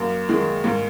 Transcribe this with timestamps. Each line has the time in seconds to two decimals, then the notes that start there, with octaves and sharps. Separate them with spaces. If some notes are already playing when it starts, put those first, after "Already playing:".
Already playing: F#2 A#3
0.29 D#3 G#3
0.64 G#2 A#3